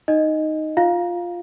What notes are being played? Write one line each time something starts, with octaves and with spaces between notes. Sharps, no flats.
D#4 D#5
F4 F5